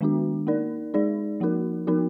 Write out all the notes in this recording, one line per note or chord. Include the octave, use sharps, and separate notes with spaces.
D#3 G#3 B3 D4 F#4
A#3 D#4 A#4 D5
G#3 D#4 G#4 D5
F3 A#3 D#4 F#4 A#4
F3 B3 D#4 F#4 A#4